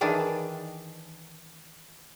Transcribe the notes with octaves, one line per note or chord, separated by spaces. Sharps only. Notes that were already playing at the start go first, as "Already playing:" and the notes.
D#3 E3 D4 G#4 D5